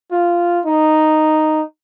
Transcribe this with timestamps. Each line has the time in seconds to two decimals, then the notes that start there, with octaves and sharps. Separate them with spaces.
0.12 F4
0.66 D#4